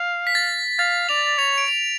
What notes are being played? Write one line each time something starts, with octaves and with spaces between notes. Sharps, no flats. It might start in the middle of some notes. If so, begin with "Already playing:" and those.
Already playing: F5
B6
A6
F5 A6
D5 F7
C#5 F7
D7
F7